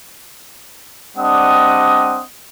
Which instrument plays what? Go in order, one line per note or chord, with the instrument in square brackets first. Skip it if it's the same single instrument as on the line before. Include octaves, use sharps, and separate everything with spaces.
[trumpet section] G3 C4 D4 D#5 F#5 D#6